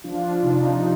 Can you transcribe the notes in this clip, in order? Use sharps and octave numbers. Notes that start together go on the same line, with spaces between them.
F3 D4 F4
C3 D#4